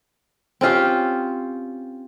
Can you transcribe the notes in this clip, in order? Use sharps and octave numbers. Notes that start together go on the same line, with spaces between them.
C4 C#4 F4 G4